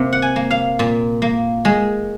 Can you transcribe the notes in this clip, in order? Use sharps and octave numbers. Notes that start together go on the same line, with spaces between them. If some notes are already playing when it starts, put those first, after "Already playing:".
Already playing: C3 A#3
F#5
G#5
A#3
F5
A#2
A#3
G#3